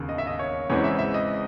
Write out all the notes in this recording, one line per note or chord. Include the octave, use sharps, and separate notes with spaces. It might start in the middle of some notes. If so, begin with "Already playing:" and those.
Already playing: E1 D#2 C#3
D#5
E5
D#5
C#5
E2 C#3 E3 G#3 C4 C#5
E5
E5
D#5